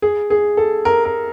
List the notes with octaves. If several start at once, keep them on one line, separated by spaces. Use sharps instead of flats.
G#4
G#4
A4
A#4
A#4